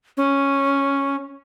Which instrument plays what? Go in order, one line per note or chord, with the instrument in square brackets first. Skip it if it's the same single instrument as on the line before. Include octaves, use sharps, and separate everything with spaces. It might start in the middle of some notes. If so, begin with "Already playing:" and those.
[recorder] C#4